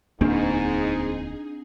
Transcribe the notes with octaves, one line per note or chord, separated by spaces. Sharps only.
D1 E2 G#2 A#3 C4 D4 D#4 G#4